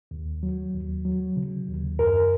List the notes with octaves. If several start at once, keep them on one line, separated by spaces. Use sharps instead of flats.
D#2
F#3
D#2
F#3
C#3
D#2
F#2 A#4